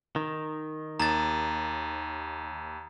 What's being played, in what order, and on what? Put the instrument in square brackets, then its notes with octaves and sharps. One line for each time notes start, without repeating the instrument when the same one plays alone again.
[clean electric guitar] D#3
[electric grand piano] D#2 [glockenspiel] A#5 A6